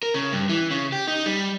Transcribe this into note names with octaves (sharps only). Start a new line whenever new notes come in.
A#4
C#3
G2
E3
C#3
G4
D#4
G3